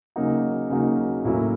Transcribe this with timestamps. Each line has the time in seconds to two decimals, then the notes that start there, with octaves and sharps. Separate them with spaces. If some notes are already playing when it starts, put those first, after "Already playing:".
0.16 C#3 F#3 A#3 D#4 F#4
0.70 C#3 F#3 A#3 D#4 F#4
1.25 A2 F#3 A#3 C#4 E4